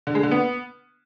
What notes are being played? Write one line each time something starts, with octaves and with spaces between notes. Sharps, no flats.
D3
G#3
D3
B3